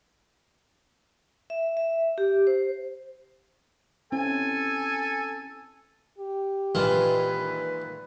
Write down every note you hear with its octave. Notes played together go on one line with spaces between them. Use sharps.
E5
E5
G4
C5
C4 C#4 E4 A4 G#5
G4
A#1 D#3 E3 G#3 D#4 F4 B4